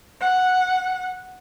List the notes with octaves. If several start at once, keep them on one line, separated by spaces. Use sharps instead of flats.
F#5